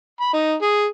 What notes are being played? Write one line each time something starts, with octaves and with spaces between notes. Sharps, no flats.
B5
D#4
G#4